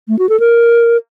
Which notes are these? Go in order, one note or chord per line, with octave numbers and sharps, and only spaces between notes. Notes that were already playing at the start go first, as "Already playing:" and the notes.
A3
F#4
A4
A#4